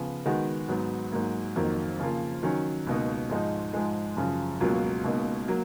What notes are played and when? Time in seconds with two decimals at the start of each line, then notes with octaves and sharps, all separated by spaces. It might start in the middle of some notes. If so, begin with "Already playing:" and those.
Already playing: C#3 F3 B3
0.26 D#3 G#3 B3 F#4
0.68 G#2 F#3 B3
1.12 G#2 F#3 A#3
1.56 F2 D#3 F#3 A#3
1.99 C#3 F3 A#3 F4
2.43 D#3 F#3 C#4
2.87 C#2 B2 A#3 D#4
3.30 G#2 F3 G#3 D#4
3.73 G#2 F3 G#3
4.17 F#2 C#3 F3
4.61 C#2 B2 F#3 A#3 F4
5.04 C#2 B2 A#3 D#4
5.48 F#3 A#3